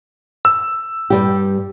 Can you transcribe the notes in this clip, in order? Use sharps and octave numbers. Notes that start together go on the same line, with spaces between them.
E6
G2 G3 G4